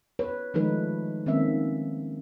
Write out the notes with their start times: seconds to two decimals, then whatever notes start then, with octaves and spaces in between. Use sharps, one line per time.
0.19 B4 C#5
0.54 D#3 F3 G#3 A3 D#4 B4
1.26 D#3 G#3 A#3 C4 C#4 E5